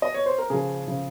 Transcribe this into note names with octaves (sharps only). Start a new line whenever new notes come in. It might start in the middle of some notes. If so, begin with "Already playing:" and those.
D#5
C#5
C5
A#4
C#3 F3 G#4
C#3 F3